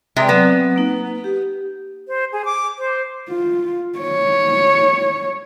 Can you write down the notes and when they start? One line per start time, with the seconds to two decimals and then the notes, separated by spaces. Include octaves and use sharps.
0.16 C3 G#3 G4 B4 D5
0.29 F#3 B3 C4
0.76 A#3 D#4
1.24 G4
2.08 C5
2.33 G#4
2.45 D6
2.78 C5
3.30 F4
3.99 C#5